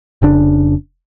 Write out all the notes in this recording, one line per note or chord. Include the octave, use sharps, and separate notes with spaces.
F1 C#3 D4